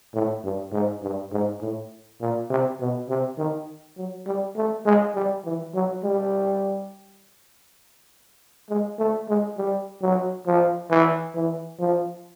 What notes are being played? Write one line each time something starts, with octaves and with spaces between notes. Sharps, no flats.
A2
G2
G#2
G2
G#2
A2
A#2
C3
B2
C3
D#3
F#3
G3
A3
G#3
G3
E3
F#3
G3
G#3
A3
G#3
G3
F#3
F3
E3
E3
F3